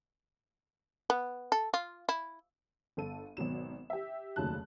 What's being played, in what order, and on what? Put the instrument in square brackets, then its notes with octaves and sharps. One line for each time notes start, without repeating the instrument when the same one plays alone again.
[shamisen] B3
A4
F4
E4
[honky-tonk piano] G1 A4 D#7
G#1 B2 F#3 E7
G4 E5
F1 D#2 C#3 F#3 A5 F#6